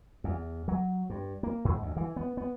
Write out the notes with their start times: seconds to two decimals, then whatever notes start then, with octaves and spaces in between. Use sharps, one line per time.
0.24 E2
0.68 F#3
1.10 G2
1.43 A#3
1.65 G#2
1.82 D2
1.96 E3
2.16 B3
2.37 B3